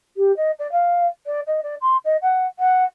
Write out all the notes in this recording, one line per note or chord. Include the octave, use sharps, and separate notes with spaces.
G4
D#5
D5
F5
D5
D#5
D5
C6
D#5
F#5
F#5